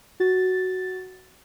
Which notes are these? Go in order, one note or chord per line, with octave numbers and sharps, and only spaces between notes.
F#4 A6